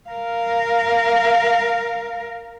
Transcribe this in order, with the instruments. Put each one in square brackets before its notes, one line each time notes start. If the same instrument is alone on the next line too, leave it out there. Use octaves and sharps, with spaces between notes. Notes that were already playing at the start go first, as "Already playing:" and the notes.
[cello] A#4 F5